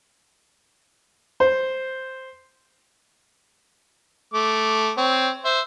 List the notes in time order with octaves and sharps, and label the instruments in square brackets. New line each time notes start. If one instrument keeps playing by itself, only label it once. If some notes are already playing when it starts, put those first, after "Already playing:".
[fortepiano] C5
[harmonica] A3 D6
C4 C#5
C5 E5